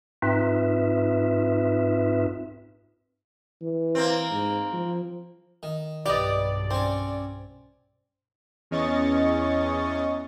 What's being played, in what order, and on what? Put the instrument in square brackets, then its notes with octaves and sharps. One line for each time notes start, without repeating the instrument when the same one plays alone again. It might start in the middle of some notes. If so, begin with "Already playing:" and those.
[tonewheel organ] G#2 C4 D#4 F4 B4 E5
[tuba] E3
[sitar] A#3 C4
[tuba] G#2
F3
[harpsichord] D#3
[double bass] B1 G2 [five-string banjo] G4 D#5 [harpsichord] B4 [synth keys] D5
[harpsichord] C4 C#4 [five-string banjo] C5
[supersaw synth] E2 C#4 D#5 C#6 A6